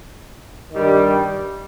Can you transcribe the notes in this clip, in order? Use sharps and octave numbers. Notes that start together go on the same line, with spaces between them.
G2 D#3 G3